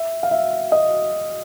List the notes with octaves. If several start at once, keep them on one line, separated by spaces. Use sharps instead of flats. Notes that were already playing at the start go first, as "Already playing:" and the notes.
Already playing: E5
F5
E5
D#5